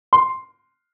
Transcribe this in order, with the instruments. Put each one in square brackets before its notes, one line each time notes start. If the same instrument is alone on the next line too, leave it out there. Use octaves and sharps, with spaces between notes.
[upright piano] C6